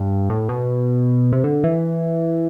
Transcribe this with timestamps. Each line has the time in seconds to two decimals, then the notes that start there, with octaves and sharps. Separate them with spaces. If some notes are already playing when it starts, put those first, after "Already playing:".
Already playing: G2
0.29 A2
0.49 B2
1.32 C3
1.44 D3
1.64 E3